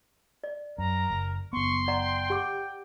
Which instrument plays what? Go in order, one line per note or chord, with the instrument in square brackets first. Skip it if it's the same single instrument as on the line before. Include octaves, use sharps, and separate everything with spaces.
[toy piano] D5
[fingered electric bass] F#2 [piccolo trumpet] A#4 [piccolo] A#5
[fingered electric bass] F#1
[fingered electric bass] F#1 B3 [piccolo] C6 [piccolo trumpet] C#6
[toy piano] D5 F#5 A#5 [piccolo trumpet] G5
[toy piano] G4 F#5 D6